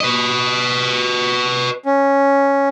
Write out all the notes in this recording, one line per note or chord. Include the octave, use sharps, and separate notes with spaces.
B4 D#5
C#4